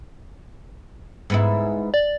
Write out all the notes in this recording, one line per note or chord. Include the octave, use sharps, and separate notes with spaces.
G#2 B3 E4
D5